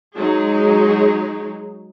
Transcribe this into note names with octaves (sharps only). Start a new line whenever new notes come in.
F#3 G#3 D#4 G#4